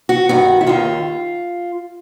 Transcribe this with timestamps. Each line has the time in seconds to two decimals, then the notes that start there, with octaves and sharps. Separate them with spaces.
0.09 F#4
0.29 G2 D#3 F#4
0.61 E4
0.67 D#2 D#3 F4